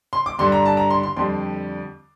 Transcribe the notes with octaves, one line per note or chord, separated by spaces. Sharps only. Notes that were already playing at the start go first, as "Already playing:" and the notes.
C6
D6
G2 D3 G3 C6
A#5
A5
A#5
C6
C6
F2 D3 G3 C6